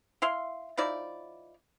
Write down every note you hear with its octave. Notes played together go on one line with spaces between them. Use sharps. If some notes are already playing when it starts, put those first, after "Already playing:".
E4 F5 C6
F3 D#4 E4 D5